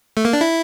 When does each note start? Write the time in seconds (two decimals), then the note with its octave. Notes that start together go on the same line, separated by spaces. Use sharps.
0.17 A3
0.25 A#3
0.33 D4
0.41 E4